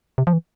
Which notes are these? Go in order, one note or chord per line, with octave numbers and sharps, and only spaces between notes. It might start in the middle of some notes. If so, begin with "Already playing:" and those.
C3
F3
E3